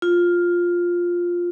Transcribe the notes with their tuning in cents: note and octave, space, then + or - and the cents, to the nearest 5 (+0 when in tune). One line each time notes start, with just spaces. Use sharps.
F4 +5